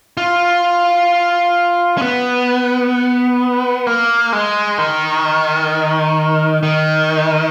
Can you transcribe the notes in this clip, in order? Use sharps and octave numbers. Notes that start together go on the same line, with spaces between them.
F4
C#4
B3
A#3
G#3
D#3
D#3